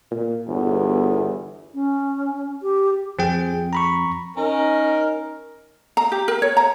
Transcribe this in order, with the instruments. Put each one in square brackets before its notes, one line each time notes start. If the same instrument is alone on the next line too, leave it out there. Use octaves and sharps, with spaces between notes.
[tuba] A#2
[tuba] G1 [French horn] E2
[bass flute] C#4
G4
[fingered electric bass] F2 [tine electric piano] C4 G#4 G5
[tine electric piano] A#5 B5 C#6
[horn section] C#4 D#4 A#4
[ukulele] A#5
G4
A#4
C#5
A#5